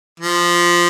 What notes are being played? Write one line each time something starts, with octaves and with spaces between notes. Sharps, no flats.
F3